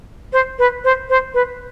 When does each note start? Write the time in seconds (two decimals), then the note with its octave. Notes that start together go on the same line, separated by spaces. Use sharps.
0.33 C5
0.59 B4
0.84 C5
1.09 C5
1.34 B4